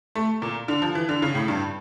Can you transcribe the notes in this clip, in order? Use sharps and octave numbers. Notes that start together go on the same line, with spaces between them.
A3
A#2
D3
F3
E3
D3
C#3
A2
G2